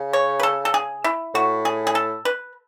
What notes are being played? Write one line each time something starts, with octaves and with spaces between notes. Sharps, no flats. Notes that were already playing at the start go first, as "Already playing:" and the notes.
Already playing: C#3
C#5
B4
A4
A4
G#4
E4
A2 F#4
G#4
G#4
A4
B4